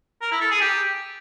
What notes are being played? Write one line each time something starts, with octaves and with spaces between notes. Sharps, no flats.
A#4
E4
A4
G#4
G4